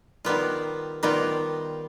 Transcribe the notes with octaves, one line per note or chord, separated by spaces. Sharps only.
D#3 G3 B3 F4
D#3 G3 B3 F4